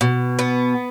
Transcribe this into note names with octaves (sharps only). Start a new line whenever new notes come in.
B2
B3